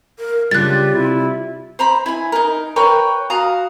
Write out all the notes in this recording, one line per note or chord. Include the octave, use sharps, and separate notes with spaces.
A#4
C#3 G3 D4 F4 G4 F#6 A6
C3 E4
C5 A#5 B5
E4 G#5
D#4 A#4
A#4 B4 C#5 G5
F#4 F5 A#5 D#6